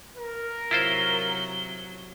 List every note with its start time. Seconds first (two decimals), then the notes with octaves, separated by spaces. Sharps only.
0.17 A#4
0.71 C3 F#3 E4 F4 C5 G7